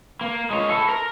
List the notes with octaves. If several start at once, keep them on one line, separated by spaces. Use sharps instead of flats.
A#3
G#3 C#5
E4 A4
A#4 A#5